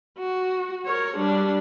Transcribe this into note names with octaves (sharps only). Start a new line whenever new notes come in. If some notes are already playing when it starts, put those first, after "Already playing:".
F#4
A#4 C#5
G3 D4